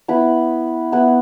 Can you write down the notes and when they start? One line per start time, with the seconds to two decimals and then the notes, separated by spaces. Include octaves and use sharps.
0.08 B3 E4 B4
0.92 B3 E4 B4